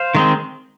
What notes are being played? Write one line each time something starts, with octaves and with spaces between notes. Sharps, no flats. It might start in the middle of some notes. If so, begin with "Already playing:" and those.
Already playing: C5 F5
D#3 G#3 C4